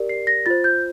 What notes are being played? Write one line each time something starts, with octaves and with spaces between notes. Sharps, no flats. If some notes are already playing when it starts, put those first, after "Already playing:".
Already playing: G4 A#4 D5
C7
A#6
F4 C5 A6
G6